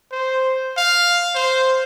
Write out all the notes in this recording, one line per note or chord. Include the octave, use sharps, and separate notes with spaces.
C5
F5
C5